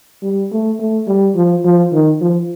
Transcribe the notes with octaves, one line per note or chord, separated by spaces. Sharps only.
G3
A3
A3
G3
F3
F3
D#3
F3